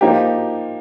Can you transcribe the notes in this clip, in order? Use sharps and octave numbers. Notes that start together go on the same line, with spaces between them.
F3 A#3 D#4 G4